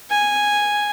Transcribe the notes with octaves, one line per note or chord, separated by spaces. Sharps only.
G#5